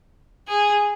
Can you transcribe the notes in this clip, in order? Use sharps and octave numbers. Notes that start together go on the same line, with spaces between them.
G#4